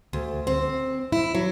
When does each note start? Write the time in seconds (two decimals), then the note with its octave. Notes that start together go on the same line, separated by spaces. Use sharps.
0.13 D2
0.47 C4
1.12 E4
1.35 F#3